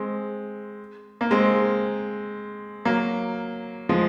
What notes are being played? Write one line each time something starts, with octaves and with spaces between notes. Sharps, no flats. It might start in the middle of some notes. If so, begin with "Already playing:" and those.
Already playing: G#3 C4
A#3
G#3 C4
F#3 A#3
F3 G#3